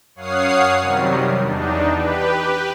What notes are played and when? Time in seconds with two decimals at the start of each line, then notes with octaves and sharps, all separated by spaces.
0.15 F#2 C#5 F5 F#5 D#6 C7
0.80 C3 D#3 F#3 G3
1.41 E2 D4 D#4
1.95 G4 B4